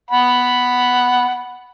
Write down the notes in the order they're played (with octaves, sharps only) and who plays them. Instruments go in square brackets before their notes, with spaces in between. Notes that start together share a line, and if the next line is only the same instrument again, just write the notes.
[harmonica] F#5 B5